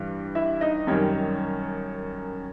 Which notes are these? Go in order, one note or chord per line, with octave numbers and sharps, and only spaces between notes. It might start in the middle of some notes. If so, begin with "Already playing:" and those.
Already playing: G2 E3 G3
E4 E5
D#4 D#5
F#2 D#3 G3 C#4 C#5